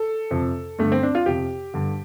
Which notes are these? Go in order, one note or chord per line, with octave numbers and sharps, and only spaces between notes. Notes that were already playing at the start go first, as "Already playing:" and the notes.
Already playing: A4
F2 C3
G2 D3 A3
C4
D4
F4
F2 C3 G4
G2 D3